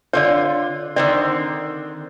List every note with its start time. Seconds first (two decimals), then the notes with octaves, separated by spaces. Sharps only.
0.13 D3 F4 C#5 D5
0.96 D3 D#3 C4 D5